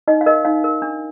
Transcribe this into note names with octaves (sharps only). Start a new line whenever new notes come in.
D#4 D#5
F5
A#4 D#5
D#4 F5
A#4
D4